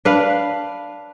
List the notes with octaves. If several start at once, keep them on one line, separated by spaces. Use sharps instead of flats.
D4 B4 F5